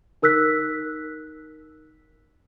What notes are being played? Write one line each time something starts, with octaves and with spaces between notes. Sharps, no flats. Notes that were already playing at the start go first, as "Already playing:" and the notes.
D#4 A#4 E6 F#6 B6